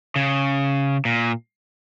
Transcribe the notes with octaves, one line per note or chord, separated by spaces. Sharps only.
C#3
A#2